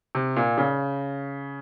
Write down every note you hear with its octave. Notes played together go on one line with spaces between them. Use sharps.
C3
A#2
C#3